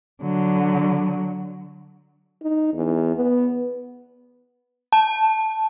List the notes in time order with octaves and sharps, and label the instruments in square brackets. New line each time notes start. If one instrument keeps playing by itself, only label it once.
[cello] D3 F#3
[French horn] D#4
E2
B3
[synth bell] A5